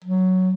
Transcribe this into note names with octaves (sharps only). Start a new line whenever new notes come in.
F#3